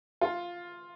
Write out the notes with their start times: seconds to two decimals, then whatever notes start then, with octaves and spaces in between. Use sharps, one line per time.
0.21 F4